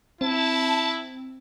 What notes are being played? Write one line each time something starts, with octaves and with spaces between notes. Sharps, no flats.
C4 E4 A5